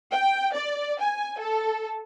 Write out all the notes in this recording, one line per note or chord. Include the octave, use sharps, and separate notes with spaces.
G5
D5
G#5
A4